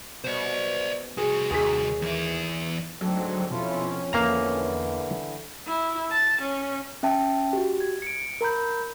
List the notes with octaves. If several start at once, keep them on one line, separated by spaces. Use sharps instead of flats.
B2 C5 D5
C2 F#4 G#4
D#2 G#4 B6
E2 E4
D2 G#2 F#3 C4 D4 A4
F2 B2 C#4 E4 F4 A4
E2 D3 E3 A#3 F5 A#5
E4
A5
C#4
C#4 E5 G5 A5
F#4 G4
G#6
C#7 D7
A#4 A#5 B5 G6